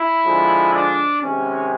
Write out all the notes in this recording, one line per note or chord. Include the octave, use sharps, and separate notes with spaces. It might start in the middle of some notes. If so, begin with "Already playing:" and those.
Already playing: E4
D3 F3 G#3
D4
C3 D#3 G#3 C#4